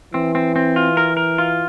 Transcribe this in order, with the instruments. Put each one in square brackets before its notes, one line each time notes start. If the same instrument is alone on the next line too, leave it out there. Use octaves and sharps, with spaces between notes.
[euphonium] E3 [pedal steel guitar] C4
[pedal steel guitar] C4
C4
F4
A#4
A#4
F4